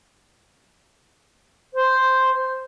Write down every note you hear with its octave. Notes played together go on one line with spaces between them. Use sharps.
C5